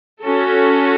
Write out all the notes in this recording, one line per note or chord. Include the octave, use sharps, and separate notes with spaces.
C#4 F#4 A4